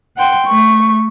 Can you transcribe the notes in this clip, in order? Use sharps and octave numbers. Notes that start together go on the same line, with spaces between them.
F#5 G5 C6
A3 C#6